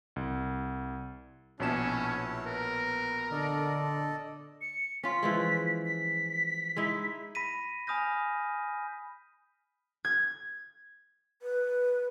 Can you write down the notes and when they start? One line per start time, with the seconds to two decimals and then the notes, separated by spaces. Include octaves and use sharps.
0.16 C2
1.60 A#1 B2 C#4 E4 C#5 A5 E7
2.46 A#4 B4
3.31 D3 A4 D5 D#5
4.61 C#7
5.03 C#4 F4 B6
5.23 E3 F3 G#3
5.85 B6
6.76 G#3 D#4 E4
7.35 B5 A#6 B6 D#7
7.87 G#5 B5 D#6 F6 G6 A#6
10.05 G#6
11.42 B4